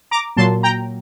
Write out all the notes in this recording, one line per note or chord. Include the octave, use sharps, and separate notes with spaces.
A#5 D6
A#2 F#3 A#3 A5 C6
G5 A#5